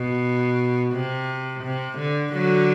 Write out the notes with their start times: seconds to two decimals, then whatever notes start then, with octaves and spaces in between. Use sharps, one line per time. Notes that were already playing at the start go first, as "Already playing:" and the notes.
Already playing: B2
0.93 C3
1.64 C3
1.99 D3
2.33 D3 F#3